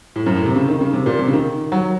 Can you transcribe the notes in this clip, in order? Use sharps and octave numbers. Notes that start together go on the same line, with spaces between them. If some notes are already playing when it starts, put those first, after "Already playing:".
A2
F#2
A2
C3
C#3
D#3
C#3
C3
A#2
C3
C#3
D#3
F#3